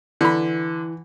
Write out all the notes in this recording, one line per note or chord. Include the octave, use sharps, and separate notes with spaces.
D3 E3 B5